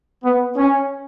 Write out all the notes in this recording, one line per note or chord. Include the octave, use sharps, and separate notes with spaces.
B3
C#4